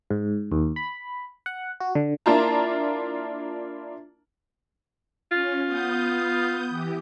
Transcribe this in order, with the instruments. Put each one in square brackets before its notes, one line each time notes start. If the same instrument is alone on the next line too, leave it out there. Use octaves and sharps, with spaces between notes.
[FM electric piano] G#2
D#2
B5
F#5
F#4
D3
[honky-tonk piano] A#3 D4 E4 F4 A5 A#5
[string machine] C#4 [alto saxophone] F4
[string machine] B3 D#6 G6
E3 G4